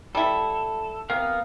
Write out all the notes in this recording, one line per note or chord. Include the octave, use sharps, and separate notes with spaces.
G3 E4 A4
C3 B3 A#4 F5